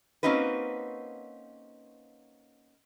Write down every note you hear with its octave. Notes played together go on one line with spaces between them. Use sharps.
A#3 C4 C#4 D#4 F#4 B4